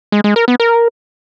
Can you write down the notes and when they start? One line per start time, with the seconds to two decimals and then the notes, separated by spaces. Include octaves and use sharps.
0.12 G#3
0.24 G#3
0.36 A#4
0.48 B3
0.60 A#4